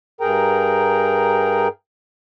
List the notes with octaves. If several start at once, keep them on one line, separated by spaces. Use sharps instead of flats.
G2 G#4 A#4 G5 A#5